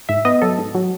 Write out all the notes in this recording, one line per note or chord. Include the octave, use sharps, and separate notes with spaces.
G#2 E5
B3 D#5
F#3 A4
G#2
F#3